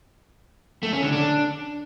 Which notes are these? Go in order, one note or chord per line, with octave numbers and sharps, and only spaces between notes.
A3
C#4
D3
D4